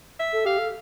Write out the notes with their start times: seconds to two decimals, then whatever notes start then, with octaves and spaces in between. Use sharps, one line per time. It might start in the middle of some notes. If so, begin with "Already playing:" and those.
0.20 E5
0.33 A4
0.45 G4 F5
0.58 A4